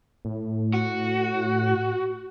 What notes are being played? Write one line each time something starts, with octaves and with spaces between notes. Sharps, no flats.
A2
F#4